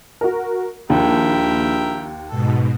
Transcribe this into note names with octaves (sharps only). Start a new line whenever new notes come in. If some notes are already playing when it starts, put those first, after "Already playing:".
F#4 A#4
A#1 D#2 A#4 E5 G5
G#2 B2 A4